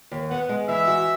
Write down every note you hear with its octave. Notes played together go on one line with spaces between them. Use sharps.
D#2
B3 F#5
G#3
E3 E5
F#4